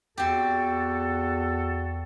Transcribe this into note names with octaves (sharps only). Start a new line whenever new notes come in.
E2 C4 F#4 G4 A4